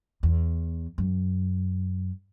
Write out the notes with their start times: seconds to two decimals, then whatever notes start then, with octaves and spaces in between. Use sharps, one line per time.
0.23 E2
0.98 F#2